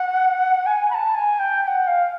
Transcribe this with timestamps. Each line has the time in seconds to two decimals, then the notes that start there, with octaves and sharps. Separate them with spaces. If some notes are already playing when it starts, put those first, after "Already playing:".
Already playing: F#5
0.66 G#5
0.90 B5
0.94 A5
1.15 G#5
1.39 G5
1.63 G5
1.67 F#5
1.87 F5